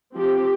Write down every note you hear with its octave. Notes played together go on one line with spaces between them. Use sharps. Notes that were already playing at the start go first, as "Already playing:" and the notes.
F3 C4 G4